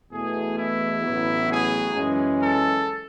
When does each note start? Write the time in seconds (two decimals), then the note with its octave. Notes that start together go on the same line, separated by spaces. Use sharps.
0.11 E2 B2 A3 G#4
0.57 E4
1.03 A1 A2 F#3 B3
1.49 G#4
1.95 F#2 E3 G#3 C#4
2.41 A4